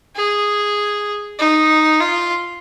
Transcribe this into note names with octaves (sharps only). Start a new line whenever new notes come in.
G#4
D#4
F4